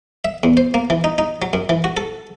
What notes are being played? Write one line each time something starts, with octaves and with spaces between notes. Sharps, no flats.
E5
E2
C5
A#3
E3
D#4
D#4
F#3
F#2
E3
F#4
A4